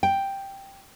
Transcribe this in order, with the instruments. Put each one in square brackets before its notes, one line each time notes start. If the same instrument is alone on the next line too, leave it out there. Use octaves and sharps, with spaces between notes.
[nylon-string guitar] G5